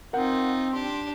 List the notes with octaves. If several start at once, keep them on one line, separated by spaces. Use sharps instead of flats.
C4 D#4 F4 A#4 F#5 G6
D4 G4 C6